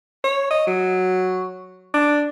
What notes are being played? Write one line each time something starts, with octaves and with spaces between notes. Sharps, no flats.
C#5
D#5
F#3
D4